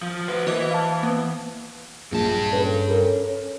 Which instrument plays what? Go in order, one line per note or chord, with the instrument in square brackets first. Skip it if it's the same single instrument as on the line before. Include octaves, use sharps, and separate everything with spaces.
[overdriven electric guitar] F3
[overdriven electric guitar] F#4 C5 [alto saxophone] B4
[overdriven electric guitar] E3 [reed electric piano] A#3 [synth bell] C5 D#5 D6
[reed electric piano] F5 A5
[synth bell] A#3 [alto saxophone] B3
[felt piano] A#1 [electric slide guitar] G2 A5 [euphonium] G#4
[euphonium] C#4 [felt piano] A4 B4
[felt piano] A4 A#4